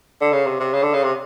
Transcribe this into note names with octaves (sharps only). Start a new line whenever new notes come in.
D3
C#3
C3
C3
C#3
D3
C#3
C3